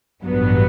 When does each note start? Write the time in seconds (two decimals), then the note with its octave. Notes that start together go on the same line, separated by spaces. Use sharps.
0.23 A1 G2 F#3 B3